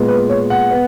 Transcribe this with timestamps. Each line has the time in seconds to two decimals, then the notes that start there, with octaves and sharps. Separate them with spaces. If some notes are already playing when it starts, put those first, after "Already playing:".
Already playing: A#2 G#3 B3
0.08 B4
0.30 C#5
0.50 F#5
0.71 B3